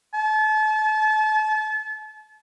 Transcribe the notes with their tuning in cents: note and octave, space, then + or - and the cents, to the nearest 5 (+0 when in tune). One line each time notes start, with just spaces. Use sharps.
A5 -35